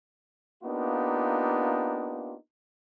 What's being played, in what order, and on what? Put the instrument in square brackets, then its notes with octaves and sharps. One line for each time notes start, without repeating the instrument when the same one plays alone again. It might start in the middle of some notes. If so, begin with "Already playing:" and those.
[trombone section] A#3 B3 D4 D#4 F4 G4